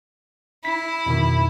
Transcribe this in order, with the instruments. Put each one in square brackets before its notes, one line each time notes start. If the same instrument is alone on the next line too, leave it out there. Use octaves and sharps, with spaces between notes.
[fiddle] E4 [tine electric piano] B6
[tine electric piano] F2 B2 D#3